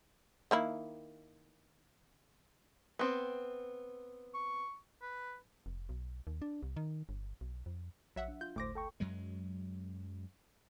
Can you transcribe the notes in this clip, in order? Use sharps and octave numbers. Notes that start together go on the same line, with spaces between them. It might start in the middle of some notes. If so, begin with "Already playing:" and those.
D#3 A#3 E4
B3 C4
C#6
B4
F1
B1
D#2
D4
C2
D#3
G1
B1
F2
A#1 F#3 E5 F#5
D4
F4 G6
G1 D2 A2 C5 D6 A#6
A4 G5 C#6
F#2 F#3 G#3